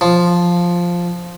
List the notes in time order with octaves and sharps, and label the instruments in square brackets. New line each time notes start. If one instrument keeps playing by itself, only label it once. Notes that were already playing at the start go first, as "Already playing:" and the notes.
[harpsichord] F3